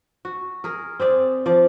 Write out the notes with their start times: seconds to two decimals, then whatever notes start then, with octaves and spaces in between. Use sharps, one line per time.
0.25 F#4
0.64 G#4 A#4
1.00 C4 G#4 D5
1.46 F3 D5